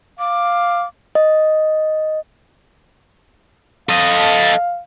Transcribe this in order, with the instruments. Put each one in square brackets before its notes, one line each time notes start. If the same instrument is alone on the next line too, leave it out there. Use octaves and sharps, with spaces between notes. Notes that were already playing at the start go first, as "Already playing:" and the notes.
[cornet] F5 [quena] D6
[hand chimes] D#5
[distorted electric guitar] A4 D#5 [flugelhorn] F5